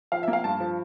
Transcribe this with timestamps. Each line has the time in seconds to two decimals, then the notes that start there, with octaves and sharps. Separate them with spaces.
0.12 F3 F5
0.23 E5
0.28 A#3
0.33 F5
0.44 G2 A5
0.60 F3